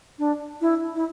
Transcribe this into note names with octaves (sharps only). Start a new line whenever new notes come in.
D4
E4
E4